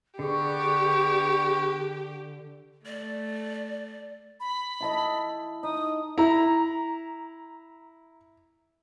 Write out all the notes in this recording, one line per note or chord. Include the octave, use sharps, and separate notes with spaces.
D3 B3 G4 G#4 D5 C#6
A3 D5
B5
E4 A4 D#5
D#4 D#6
E4 A#5